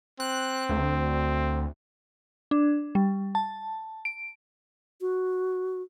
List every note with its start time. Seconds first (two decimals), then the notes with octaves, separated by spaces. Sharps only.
0.20 C4 F#6
0.69 D2
2.51 D4
2.95 G3
3.35 A5
4.05 D7
5.01 F#4